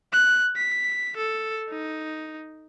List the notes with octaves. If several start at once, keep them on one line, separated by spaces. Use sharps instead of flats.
F#6
B6
A4
D#4